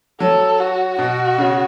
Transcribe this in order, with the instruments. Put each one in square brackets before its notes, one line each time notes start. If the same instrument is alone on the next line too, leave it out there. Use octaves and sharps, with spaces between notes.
[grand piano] F#3 [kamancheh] A4
[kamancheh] F#4
[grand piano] B2 [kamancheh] F#4
[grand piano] C#3